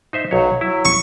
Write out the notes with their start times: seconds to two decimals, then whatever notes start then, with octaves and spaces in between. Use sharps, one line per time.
0.13 D#4 C5 E5
0.31 B1 F#3 C#5
0.61 F#3 E4
0.85 C#6